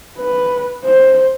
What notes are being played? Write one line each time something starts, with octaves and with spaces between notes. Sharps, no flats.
B4
C5